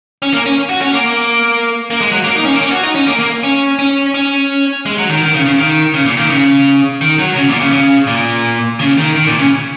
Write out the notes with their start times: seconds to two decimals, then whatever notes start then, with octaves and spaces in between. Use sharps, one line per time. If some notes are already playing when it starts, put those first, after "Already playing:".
0.22 C#4
0.33 A#3
0.46 C#4
0.69 F#4
0.81 C#4
0.94 A#3
1.90 A#3
2.01 G#3
2.12 F#3
2.25 A#3
2.35 D#4
2.45 C#4
2.54 A#3
2.61 C#4
2.71 F#4
2.83 D#4
2.95 C#4
3.08 A#3
3.19 A#3
3.43 C#4
3.79 C#4
4.14 C#4
4.86 G#3
4.98 F#3
5.10 D#3
5.22 D#3
5.34 C#3
5.46 C#3
5.58 D#3
5.94 C#3
6.06 A#2
6.17 D#3
6.30 C#3
7.01 D#3
7.18 F#3
7.36 C#3
7.49 A#2
7.60 C#3
7.72 C#3
8.07 A#2
8.80 C#3
8.97 D#3
9.16 D#3
9.27 A#2
9.39 C#3